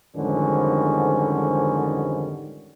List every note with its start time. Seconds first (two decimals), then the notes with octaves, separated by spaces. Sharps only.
0.16 F2 G#2 D3 D#3 G3 C#4